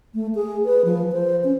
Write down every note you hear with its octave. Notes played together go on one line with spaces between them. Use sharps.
A3
G#4
B4
F3
C5
C#4